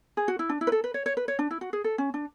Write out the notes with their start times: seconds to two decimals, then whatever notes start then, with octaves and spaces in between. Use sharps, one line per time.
0.17 G#4
0.28 F#4
0.39 E4
0.49 D4
0.61 E4
0.67 B4
0.72 A4
0.84 B4
0.94 C#5
1.06 C#5
1.17 B4
1.28 C#5
1.39 D4
1.51 E4
1.61 F#4
1.73 G#4
1.84 A4
1.98 C#4
2.14 D4